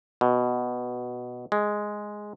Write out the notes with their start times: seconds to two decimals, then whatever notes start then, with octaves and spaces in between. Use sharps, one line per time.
0.21 B2
1.52 G#3